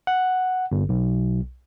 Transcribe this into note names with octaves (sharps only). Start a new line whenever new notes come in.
F#5
G1
B1